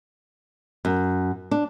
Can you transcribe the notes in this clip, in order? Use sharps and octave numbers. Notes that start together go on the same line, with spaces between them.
F#2
D4